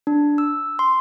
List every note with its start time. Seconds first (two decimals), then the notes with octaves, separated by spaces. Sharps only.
0.07 D4
0.38 E6
0.79 C6